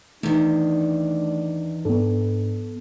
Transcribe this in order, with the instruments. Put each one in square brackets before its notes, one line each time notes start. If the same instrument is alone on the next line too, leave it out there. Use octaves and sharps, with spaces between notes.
[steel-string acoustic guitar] E2 D#3 [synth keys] A3 [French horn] D4
[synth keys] G#2 F3 D4 [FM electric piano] B3 A4